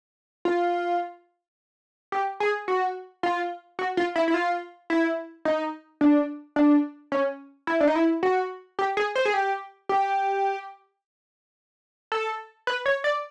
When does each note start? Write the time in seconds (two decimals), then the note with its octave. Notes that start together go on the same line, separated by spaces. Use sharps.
0.45 F4
2.12 G4
2.40 G#4
2.68 F#4
3.23 F4
3.79 F#4
3.97 F4
4.16 E4
4.28 E4
4.34 F4
4.90 E4
5.45 D#4
6.01 D4
6.56 D4
7.12 C#4
7.67 E4
7.80 D4
7.88 D#4
7.96 E4
8.23 F#4
8.79 G4
8.97 G#4
9.15 C5
9.25 G#4
9.34 G4
9.89 G4
12.12 A4
12.67 B4
12.86 C#5
13.04 D5